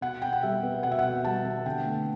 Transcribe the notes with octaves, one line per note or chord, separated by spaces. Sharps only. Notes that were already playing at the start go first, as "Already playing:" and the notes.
B2 F#5
B2 G5
F#5
G3 E5
B3
B2 F#5
E5
F#5
B2
G3 A5
B3
D3 G5
A3